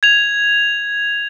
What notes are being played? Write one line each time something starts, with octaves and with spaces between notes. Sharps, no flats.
G#6 F7